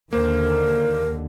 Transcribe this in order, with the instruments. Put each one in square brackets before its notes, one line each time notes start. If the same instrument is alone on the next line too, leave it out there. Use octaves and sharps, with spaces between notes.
[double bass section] D#2 D3 [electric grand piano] A#3 C5 [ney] A#4